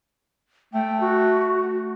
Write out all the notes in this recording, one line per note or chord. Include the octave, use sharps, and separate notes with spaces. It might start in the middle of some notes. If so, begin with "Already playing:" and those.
A3 G5
F#4